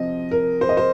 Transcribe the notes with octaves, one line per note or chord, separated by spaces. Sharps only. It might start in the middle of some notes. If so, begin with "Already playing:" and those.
Already playing: C3 F3 C4 D#5
A#4
C5
D#5
C5